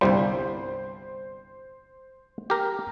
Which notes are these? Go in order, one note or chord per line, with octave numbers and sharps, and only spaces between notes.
G1 C2 G3 C5
G4 A#4